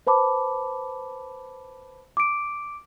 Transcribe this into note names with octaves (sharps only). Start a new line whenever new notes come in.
B4 C5 A5 B5 D6
D6 D7